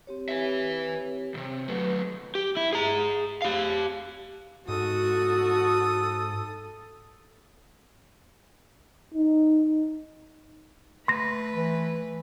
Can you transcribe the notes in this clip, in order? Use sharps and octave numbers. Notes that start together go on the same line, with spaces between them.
C4 G4 C#5
B4 E5
C#2 C3
F#3 A3 B4
G4
E4
G#4 A#5
G4 F5
G#2 F#4 A4 D#6
D#4
A3 B4 C6 A#6
E3